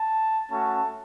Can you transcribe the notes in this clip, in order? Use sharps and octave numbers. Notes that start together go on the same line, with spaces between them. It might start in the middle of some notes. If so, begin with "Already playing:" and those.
Already playing: A5
A3 C#4 F#4 A5